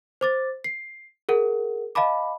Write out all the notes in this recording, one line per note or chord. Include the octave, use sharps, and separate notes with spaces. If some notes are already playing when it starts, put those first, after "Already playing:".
C5 D6 A6
C7
G#4 A#4 F#5
D#5 F5 A5 B5 D6